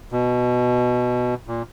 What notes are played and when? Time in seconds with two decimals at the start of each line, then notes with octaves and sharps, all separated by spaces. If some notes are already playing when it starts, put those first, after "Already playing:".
0.12 B2
1.47 A#2